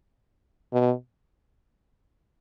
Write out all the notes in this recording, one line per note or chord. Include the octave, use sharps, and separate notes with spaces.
B2